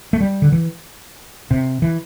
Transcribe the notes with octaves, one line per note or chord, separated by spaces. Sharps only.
A3
G3
D3
E3
C3
E3